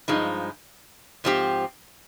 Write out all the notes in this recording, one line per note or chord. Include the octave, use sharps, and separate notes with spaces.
G2 F3 G#3 D#4
G#2 F3 C4 G4